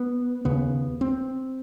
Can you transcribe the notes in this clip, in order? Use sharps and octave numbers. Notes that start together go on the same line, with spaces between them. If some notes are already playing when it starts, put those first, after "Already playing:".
Already playing: B3
D#2 C#3 B3
C4